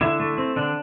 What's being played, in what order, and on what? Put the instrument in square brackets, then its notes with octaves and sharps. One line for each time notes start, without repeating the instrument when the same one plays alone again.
[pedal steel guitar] D3 E4
A3
C4
D3 D4